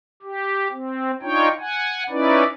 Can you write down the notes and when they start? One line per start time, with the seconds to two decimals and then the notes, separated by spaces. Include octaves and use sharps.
0.23 G4
0.71 C4
1.22 D4 D#4 F4 C#5 G5
1.60 F#5 G#5
2.10 C#4 D#4 E4 B4 D5